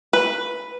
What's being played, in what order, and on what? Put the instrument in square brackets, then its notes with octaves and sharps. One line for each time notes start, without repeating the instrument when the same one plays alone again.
[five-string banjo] B4